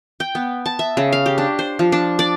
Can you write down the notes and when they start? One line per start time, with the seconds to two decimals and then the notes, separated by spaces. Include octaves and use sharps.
0.20 G5
0.35 B3
0.66 A5
0.79 E5
0.97 C#3
1.13 F5
1.26 G4
1.38 D4
1.59 C5
1.79 F3
1.92 D4
2.19 D5